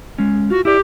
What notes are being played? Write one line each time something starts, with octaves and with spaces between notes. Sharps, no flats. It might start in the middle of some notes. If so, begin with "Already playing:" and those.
G#3 C#4
F4 F#4
E4 G4 D5